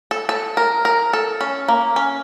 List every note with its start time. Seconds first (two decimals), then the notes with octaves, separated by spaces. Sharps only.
0.11 A4
0.29 A4
0.57 A#4
0.85 A#4
1.13 A4
1.41 C#4
1.68 A#3
1.96 C#4